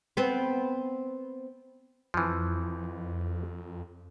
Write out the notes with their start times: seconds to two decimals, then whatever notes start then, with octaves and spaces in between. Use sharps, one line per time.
0.17 B3 C4
2.14 F2 E3 F3